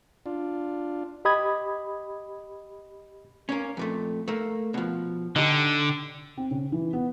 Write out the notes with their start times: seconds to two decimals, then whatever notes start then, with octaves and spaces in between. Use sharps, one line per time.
0.26 D4 F4
1.25 G4 D#5 B5 D#6 G#6
3.49 A#3 C#4
3.77 F2 A#2 A3
4.28 A3 A#3
4.74 B2 F3
5.36 D3 D#4 G4
6.37 C4
6.51 C#3
6.72 E3
6.93 B3